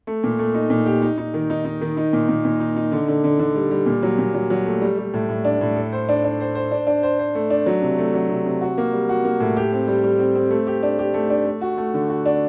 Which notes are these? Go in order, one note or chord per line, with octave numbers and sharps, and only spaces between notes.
A3
A#2
A3
D#4
A#2
G4
D#4
D#4
D#3
D#4
D#4
D#3
D#4
A#2
A#2
A#2
D#4
D#4
D3
D3
D3
D3
G3
G3
A#2
F#3
A#2
F#3
F#3
A3
G3
G3
A2
A2
D4
A2
A4
C5
D4
D4
C5
C5
D4
D4
C5
C5
A3
D4
F#3
C3
A3
F#3
C3
C3
F#4
A#3
G3
F#4
A#3
A2
G4
C4
G3
G3
C4
C4
A3
G4
D4
G4
A3
D4
A3
F#4
A3
D3
F#4
D4